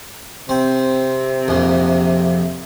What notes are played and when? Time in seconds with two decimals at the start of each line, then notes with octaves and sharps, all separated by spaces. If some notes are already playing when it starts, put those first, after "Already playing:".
0.49 C3 C4
1.48 A#1 F2